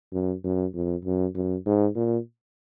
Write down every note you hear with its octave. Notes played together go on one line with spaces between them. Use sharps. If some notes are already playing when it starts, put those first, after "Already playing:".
F#2
F#2
F2
F#2
F#2
G#2
A#2